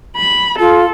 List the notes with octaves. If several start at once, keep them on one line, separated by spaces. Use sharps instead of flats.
B5
F4 A4